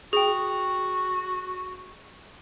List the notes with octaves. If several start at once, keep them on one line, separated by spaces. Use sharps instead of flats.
F#4 G#4 G5